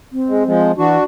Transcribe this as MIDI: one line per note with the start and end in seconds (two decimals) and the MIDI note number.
0.12 0.72 60
0.28 0.43 56
0.46 0.72 53
0.46 0.72 56
0.77 0.97 52
0.77 1.04 62
0.77 1.04 66